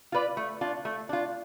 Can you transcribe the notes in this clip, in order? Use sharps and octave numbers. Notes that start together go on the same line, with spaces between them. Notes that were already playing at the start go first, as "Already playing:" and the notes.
F4 B4 D5
A3
D4 F4
A3
D4 F4